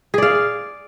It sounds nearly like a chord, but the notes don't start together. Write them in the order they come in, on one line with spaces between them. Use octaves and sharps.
G#4 D5 F5